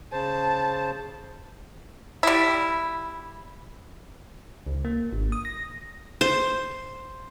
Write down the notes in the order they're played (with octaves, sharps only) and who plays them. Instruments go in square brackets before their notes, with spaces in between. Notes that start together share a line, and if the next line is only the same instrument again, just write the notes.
[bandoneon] C#3 C5 [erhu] A5
[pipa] G3 E4
[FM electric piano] C#2
A#3
G#1
D#6
A#6
[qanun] C5